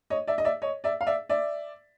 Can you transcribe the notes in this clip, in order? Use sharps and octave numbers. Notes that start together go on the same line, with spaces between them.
C#5 D#5
D5 E5
D#5
D5 E5
C#5 D#5
D5 E5
F5
D5 E5
D5 E5